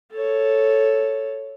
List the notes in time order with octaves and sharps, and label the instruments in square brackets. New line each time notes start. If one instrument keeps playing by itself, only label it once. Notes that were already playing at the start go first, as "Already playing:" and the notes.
[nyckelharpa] A4 C#5